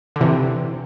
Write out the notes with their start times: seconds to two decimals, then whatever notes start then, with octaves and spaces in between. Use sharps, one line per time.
0.16 D3
0.21 C3 E3